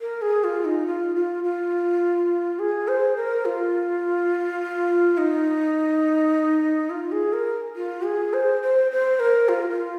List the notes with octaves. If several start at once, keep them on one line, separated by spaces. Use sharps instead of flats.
A#4
G#4
F4
D#4
F4
F4
F4
G#4
C5
A#4
F4
D#4
F4
G#4
A#4
F4
G#4
C5
C5
C5
A#4
F4
F4